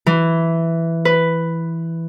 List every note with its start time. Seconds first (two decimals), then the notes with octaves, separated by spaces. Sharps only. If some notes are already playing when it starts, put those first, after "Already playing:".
0.06 E3
1.05 B4